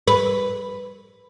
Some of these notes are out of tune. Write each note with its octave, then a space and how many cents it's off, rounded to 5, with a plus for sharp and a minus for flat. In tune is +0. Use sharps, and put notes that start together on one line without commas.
B4 +5